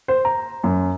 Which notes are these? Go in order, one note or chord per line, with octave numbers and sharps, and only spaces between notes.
C5
A#5
F#2